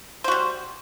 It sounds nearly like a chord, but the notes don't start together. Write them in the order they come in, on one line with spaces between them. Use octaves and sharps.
C5 F#4 G3